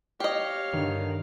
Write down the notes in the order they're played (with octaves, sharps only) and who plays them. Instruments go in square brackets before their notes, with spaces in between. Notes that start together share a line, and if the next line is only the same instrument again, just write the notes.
[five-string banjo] G4 D#5 [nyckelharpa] C#5 F5
[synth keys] G2 D3 [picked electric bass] D#3